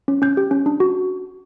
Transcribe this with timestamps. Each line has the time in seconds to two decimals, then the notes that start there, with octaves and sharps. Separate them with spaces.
0.08 C#4
0.22 C#4 G6
0.37 G4
0.51 C#4
0.66 D4
0.80 F#4